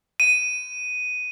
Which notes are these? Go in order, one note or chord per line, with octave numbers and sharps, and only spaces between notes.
D#7